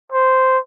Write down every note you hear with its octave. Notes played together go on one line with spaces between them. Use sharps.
C5